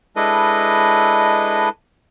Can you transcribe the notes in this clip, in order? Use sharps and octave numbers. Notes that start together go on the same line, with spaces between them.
G#3 D4 E4 A4 B4 D#5